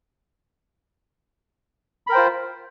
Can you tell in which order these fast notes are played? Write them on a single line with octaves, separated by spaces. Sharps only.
B5 A#4 G5 C5 F4